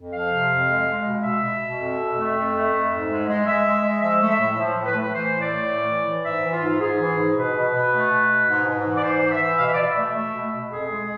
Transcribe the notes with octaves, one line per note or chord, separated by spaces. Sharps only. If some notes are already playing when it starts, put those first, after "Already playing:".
Already playing: F2
F3 F5
C3
F2
G#3
G#3
B2
B2 E5
B2
B2
F2
F2
A3
F2
A3
F2
G#2
G#3
G#3
G#3 E5
G#3
G#3
F3 E5
A3
E5
A2
F3
A2
B4
A3
B4
E3 C5
A2
D5
A3
A2
E3
E3
G#2 E5
E3
F4
G#2
G#2 G#4
E3
G#2
B2 B4
B2
B2
A3
B2
B2
G#2
G#2
E3
D5
G#2 C5
E3
E5
E3
B2 F5
E5
D5
B2 E5
A3
A3
B2
B2
F2 G#4
G#3